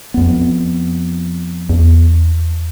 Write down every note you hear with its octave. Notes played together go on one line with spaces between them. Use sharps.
F2 B3
E2